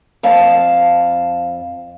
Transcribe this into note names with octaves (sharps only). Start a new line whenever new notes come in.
F2 F5 A5